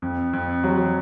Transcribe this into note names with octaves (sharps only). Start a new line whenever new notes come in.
F2
F2
F#3